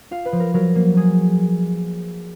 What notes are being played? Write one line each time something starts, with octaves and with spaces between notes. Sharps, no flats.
F4 F5
B4
F3
A#4
F#3 A#4
A#3
A#3 G#4